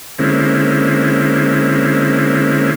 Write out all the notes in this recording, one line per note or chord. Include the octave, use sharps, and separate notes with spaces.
D3 G#3 A#3 C4 C#4 E4